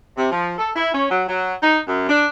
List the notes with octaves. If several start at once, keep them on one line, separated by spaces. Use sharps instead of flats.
C3
F3
A4
E4
C#4
F#3
F#3
D#4
F#2
D4